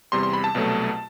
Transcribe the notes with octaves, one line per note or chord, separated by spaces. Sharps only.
E2 C3 G3 C6
C6
B5
A5
C2 B2 F#3 A3